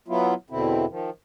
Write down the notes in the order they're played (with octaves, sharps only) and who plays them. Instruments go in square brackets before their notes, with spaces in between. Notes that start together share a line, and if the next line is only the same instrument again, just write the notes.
[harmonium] F#3 B3 E4 F4
E2 B2 D3 C4 E4
D#3 F3